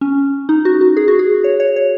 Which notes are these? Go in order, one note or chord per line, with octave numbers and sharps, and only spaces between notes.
C#4
D#4
F#4
F#4
G#4
F#4
G#4
C#5
C#5
C#5